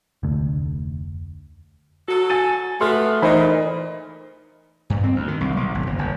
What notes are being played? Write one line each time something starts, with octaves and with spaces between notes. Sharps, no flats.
F1 D2
F#3 F#4 A4
G#5 A6 D#7
F3 A3 B3 F#4 C6 F6
A#2 E3 D#4 C5 D#5 B5
G2
C4
D2
D#3
C2
B1
G#1
F#1
F#1